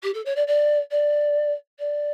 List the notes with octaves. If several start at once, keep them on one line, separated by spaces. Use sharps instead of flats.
G4
A4
C#5
D5
D5
D5
D5